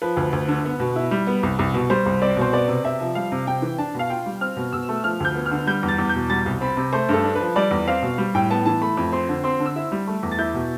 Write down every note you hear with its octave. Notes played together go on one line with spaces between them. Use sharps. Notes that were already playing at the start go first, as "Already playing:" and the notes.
F3 B4
D2
D2
D3
B3
B2
E4
G3
B3
C2
C2
B2
G3 C5
C2
C4 D5
B2 C5
B3 D5
C3
C3 E5
F3
G3 F5
C3
C3 G5
E3
D4 A5
B2 F5
F4 G5
G3
C4 F6
B2
B2 E6
A3
F3 F6
D2 G6
B3
F6
D3
G3 G6
E2
A6
E2
G6
B2
G3 A6
C2
C4 B5
C3
A3 C5
G2 A4
D4
F3 B4
G3 D5
E2
C4 F5
B2
G3
A2 G5
B3 A5
E3 A5
A3 B5
F2
C4 C6
D3
C4 C6
D3
E6
E4
G3
A3
E2
A6
E4 G6
B2